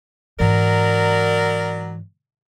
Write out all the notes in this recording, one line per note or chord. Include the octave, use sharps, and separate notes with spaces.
G#2 E3 F#3 A#4 D5